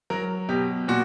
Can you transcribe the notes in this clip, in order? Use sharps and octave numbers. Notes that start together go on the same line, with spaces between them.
F#3 A#4
B2 G4
A#2 F#4